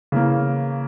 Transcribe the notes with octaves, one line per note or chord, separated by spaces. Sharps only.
C#3 E3 A#3